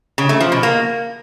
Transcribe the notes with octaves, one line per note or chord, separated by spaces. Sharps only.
C#3
A3
F3
B2
A#3